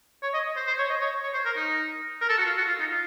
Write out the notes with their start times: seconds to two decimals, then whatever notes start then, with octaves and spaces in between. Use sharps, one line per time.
0.23 C#5
0.34 D#5
0.57 C5
0.67 C5
0.78 C#5
0.90 D#5
1.01 C#5
1.23 C#5
1.34 C5
1.45 A#4
1.56 D#4
2.21 A#4
2.29 A4
2.38 F#4
2.45 F4
2.57 F#4
2.68 F4
2.80 D#4
2.90 F4